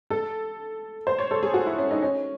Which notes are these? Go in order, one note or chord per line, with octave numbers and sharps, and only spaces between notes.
A4
C5
C#5
A4
G#4
F#4
E4
C#4
D#4
C#4